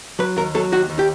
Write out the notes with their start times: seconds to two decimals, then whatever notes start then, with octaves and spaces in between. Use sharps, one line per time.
0.19 F#3 B4
0.37 D#2 A#4
0.55 F#3 A4
0.72 D#2 F#4
0.90 D#2
0.99 G4